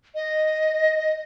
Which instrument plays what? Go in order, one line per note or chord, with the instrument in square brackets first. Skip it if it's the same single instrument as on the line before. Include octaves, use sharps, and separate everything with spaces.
[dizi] D#5